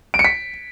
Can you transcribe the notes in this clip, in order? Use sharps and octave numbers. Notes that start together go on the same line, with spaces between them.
D7
C#7
B6